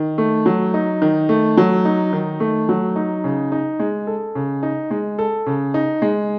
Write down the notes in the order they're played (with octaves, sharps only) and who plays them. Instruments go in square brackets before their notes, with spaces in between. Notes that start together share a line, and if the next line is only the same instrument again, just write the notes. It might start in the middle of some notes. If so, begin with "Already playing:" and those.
Already playing: [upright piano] D#3
A3
F#3
D#4
D#3
A3
F#3
D#4
D#3
A3
F#3
D#4
C#3
D#4
G#3
A4
C#3
D#4
G#3
A4
C#3
D#4
G#3